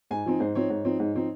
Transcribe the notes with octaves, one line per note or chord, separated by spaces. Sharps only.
G#2 G#5
F3 C4 D#4
G#2 C5
F3 C4 D#4 C#5
G#2
F3 C4 D#4
G#2
F3 C4 D#4